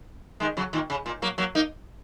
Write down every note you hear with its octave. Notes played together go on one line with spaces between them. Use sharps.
D#3 G#3
C#3 F#3
A#2 D#3
C#3
A#2
F#3 A#3
F#3 A#3
A#3 D#4